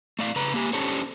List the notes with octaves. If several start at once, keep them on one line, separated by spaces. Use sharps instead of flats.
A3 D5 F5
C#3 B4 A#5
A#3 G4 G#5
C#4 D4 G4 A4 C5 C#5